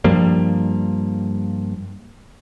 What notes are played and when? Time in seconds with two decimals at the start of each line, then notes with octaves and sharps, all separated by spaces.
0.04 G2 F3 G3 A#3